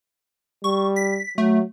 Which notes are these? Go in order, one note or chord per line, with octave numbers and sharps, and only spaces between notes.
G3 C#6
B6
F#3 A3